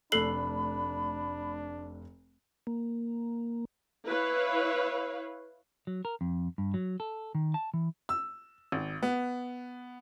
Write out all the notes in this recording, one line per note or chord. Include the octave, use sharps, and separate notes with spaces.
F1 A3 D4 A4 B5 F#6 C7 F#7
A#3
E4 B4 C#5 F5
F#3
A#4
F2
G2
F#3
A4
D#3
A5
E3
E6
G#1
B3